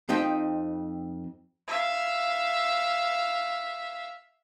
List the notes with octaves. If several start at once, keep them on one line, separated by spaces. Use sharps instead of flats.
F2 C4 D#4 G5
E5 F5